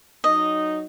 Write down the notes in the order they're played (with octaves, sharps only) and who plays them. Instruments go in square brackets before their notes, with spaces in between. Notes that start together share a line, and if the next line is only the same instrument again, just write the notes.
[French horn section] F#3 D#4 [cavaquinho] D#5